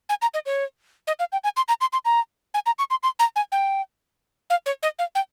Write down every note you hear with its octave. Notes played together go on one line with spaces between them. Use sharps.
G#5
A#5
D#5
C#5
D#5
F5
G5
G#5
C6
A#5
C6
C6
A#5
G#5
A#5
C#6
C6
C6
A#5
G#5
G5
F5
C#5
D#5
F5
G5